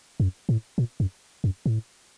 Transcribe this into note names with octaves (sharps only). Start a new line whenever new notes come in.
F#2
A2
A#2
F#2
F#2
A2